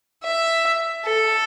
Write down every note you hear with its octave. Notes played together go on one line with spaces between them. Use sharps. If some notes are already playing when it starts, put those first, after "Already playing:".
E5
A4